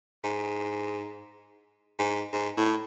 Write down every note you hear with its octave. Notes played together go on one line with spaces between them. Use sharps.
G#2
G#2
G#2
A2